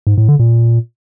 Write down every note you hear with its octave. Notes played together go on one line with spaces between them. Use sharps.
G#2
A2
D3
A#2